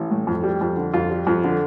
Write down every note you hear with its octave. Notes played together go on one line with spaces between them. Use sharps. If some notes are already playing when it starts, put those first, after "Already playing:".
Already playing: A1
A2
F2
G3
F2
D3
F2 F4
G3
F2
D3